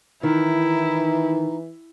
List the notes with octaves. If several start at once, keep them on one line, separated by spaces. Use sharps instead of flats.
D#3 E3 D#4 E4